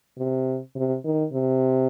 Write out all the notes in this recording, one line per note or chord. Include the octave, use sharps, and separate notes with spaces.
C3
C3
D#3
C3